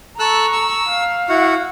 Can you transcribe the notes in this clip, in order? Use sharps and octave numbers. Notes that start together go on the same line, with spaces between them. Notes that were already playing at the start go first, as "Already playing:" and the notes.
A4 A#5 C#6 E6 F#6
E6
F5
E4 F#4 F#5